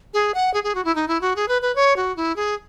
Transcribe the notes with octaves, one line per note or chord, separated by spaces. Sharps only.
G#4
F#5
G#4
G#4
F#4
E4
D#4
E4
F#4
G#4
B4
B4
C#5
F#4
E4
G#4